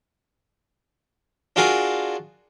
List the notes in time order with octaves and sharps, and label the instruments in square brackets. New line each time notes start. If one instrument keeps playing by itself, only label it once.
[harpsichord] D4 F4 F#4 G#4 A#4